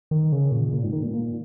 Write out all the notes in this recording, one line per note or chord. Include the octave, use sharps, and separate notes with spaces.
D#3
C#3
A#2
A#2
G#2
D#3
A#2
A#2